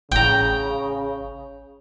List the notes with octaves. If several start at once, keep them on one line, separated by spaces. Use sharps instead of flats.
A1 C#3 G5 A#5